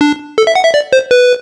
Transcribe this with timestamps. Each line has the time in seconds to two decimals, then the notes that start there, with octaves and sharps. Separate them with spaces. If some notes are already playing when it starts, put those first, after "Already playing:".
0.01 D4
0.38 A4
0.47 E5
0.55 F#5
0.65 E5
0.74 D5
0.93 C5
1.11 B4